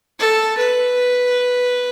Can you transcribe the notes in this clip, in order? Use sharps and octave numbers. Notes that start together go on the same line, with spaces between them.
A4
B4